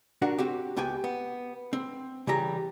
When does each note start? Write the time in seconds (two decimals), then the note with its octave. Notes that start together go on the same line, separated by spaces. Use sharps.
0.22 D4 F#4 A#4 F#5
0.38 C4 F#4 G4
0.76 C#2 B3 G4 G5 G#5
1.04 B3
1.73 C4
2.27 C#3 E3 G3 G4 A#5